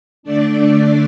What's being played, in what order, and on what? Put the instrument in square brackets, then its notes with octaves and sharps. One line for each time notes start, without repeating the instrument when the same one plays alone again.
[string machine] D3 A3 D4 D5